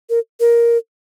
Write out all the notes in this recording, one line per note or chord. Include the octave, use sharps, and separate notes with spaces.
A#4
A#4